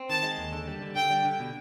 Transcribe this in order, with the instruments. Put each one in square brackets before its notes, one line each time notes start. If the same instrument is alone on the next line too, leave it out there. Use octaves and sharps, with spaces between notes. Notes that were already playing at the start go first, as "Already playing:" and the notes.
Already playing: [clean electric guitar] C4
[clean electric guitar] D#3 [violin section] A5
[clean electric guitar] G#3
D#2
D3
G3
D3
[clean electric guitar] D3 [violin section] G5
[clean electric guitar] G3
D3
B2